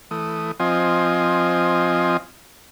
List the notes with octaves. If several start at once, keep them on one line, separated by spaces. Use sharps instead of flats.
E3 A3 D#6
F3 C4 F4 D#5 G#5